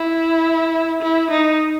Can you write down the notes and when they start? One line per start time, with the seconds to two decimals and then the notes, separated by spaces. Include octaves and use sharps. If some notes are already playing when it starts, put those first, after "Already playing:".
Already playing: E4
1.03 E4
1.31 D#4